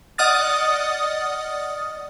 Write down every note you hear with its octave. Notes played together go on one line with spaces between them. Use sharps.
D5 D#5 F#5 D#6 F6 A6